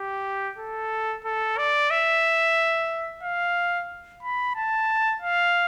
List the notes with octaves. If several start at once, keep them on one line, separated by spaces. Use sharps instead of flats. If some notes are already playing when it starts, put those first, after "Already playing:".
Already playing: G4
A4
A4
D5
E5
F5
B5
A5
F5